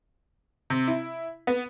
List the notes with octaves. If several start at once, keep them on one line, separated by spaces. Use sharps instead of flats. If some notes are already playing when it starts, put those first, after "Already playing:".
C3
E4
B3